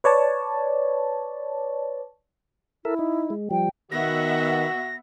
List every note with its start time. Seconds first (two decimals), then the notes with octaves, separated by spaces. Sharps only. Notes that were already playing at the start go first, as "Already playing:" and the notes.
0.04 B4 C#5 D5 A5
2.85 E4 A4 A#4 E5
2.99 D#4
3.30 G#3
3.51 F3 G3 G5
3.92 B2 D#3 B3 F#4 E5 F#5 A#6